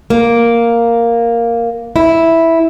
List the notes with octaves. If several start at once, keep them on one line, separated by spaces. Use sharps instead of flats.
A#3
E4